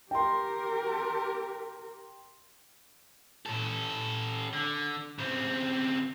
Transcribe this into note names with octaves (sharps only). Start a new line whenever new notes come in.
G4 A#4 G5 C6
C#4 A4
D3
C#3 C4